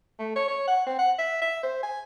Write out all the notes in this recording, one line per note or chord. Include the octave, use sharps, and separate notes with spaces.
A3
C#5
C#5
F#5
C4
F#5
E5
E5
C5
G#5